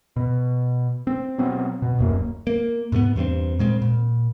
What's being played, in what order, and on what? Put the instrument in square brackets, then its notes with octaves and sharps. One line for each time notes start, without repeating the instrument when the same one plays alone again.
[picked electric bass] B2
C4
B2 F#3 B3 C4
B2
D1 F#2 A#3
A#3
G#2 C3 A3 B3
E2 G2 B3 C4
A#2 G#3 C4
A#2